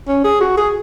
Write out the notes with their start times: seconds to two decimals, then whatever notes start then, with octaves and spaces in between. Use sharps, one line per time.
0.08 C#4
0.24 G#4
0.41 F#4
0.58 G#4